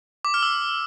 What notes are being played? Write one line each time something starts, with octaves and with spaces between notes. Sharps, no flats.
D6
F6
E6